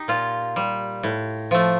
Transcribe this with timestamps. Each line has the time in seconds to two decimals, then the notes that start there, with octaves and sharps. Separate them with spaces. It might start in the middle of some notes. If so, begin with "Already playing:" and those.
Already playing: D#4 G4
0.08 A#2 F4
0.56 G3
1.03 A2
1.51 F3 A3